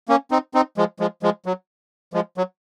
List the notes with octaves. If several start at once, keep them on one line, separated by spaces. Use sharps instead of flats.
A#3 C#4
C4 D#4
C4 D#4
F3 G#3
F3 G#3
F3 G#3
F#3
F3 G#3
F#3